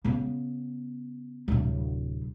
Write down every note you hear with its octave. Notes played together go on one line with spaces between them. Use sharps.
C#3 B3
D1 C3